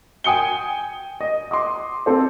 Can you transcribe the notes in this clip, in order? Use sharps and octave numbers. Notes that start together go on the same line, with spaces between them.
G5 G#5 D#6 C#7 G7
D#5
C6 D6 D#6
C4 A4 C5